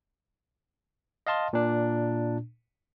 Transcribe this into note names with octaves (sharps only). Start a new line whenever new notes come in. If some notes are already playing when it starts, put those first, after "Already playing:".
D#5 F5 A5 C6
A#2 D4